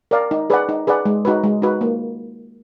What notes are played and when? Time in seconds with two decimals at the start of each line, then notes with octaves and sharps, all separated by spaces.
0.11 A#4 D5 F5
0.31 D#4
0.50 G#4 B4 D5 F#5
0.69 D#4
0.87 G#4 B4 D5 F#5
1.05 G#3
1.25 D#4 F#4 B4
1.44 G#3
1.62 D#4 F#4 B4
1.81 A#3